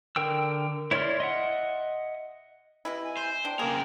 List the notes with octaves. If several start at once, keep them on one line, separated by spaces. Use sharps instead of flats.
D3 A#4 G5 E6
E4 C#5 D5 C6 F6
D#5 E5 F#5
C3 E3 E4 D#5
G#5
C5
D4 G5
C#3 A#3 G#4 A#4